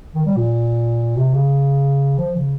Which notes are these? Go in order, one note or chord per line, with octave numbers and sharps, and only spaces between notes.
D#3
G3
A#2
C3
C#3
F3
C#3